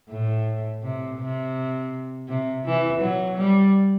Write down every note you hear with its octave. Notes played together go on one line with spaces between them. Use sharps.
A2
C3
C3
C3
E3
F#3
G3